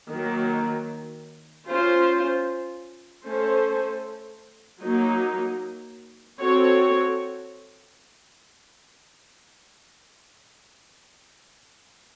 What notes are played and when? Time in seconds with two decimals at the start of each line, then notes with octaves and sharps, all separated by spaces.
0.11 D#3 F#3 A#3
1.69 C#4 F4 C5
3.26 A3 C#4 A4 C5
4.83 F#3 A#3 D#4
6.41 C4 F#4 A4 C#5